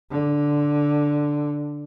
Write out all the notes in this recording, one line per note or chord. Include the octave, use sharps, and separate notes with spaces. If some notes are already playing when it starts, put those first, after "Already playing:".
D3